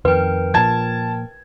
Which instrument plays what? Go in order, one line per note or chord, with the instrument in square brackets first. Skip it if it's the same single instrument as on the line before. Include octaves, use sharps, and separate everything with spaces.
[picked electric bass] F2 D#3 [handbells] A#4 G5 [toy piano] B4
[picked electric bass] A#2 F3 [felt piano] A5 G#6